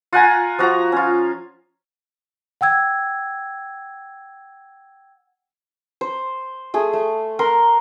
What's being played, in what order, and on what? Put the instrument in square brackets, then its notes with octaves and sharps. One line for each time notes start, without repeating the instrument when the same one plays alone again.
[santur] F4 F#5 G#5 A#5
F3 F#4 A#5
C#4 F4
[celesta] F#5 G5 E6 G#6
[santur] C5
A3 G#4
A3
A#4 F#5 C6